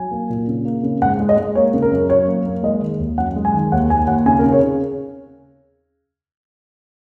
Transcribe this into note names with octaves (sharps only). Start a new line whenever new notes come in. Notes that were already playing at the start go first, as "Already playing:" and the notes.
Already playing: F#3 G#5
A#3
A#2
C#3
A#3
C#3
G#2 F#5
G#3
D#5
G#3
A#3 C#5
C#3
A#4
F#2
F#2 C#5
A#3
A#3
G#3 D#5
D#3
D#2
F#2 F#5
G#3
G#5
D#3
D#2 F#5
D#2 G#5
D#2 F#5
C#3 G#5
A#4
C#3
C#5
C#3